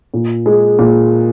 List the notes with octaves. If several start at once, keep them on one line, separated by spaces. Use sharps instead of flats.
A#2
G#3
A#2